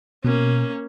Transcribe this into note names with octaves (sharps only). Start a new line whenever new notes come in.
B2 A#3 C#4